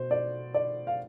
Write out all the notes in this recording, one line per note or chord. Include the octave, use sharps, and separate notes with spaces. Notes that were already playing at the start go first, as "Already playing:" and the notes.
Already playing: B2 C5
D5
D5
F5